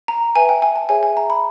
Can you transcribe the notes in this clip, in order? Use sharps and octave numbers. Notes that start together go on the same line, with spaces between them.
A#5
B4 E5 G5 G#5
G5
G#5
A5
G#4 C#5 E5 G5 G#5
G#5
A#5
B5